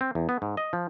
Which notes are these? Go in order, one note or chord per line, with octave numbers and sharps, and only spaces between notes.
C4
E2
B3
G#2
D#5
F3